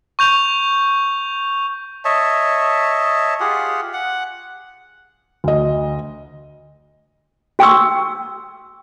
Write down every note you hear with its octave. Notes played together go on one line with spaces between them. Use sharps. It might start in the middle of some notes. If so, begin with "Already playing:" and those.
C#6 G6 F7
C#5 D#5 E5 A5
F4 G4 G#4 F#5
F#5
D2 D#5
F#4 G5 C6 C#6 D#6 E6